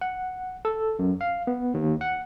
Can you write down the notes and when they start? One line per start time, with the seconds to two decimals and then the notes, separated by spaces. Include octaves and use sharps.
0.01 F#5
0.65 A4
0.99 F#2
1.21 F5
1.47 B3
1.74 D#2
2.01 F#5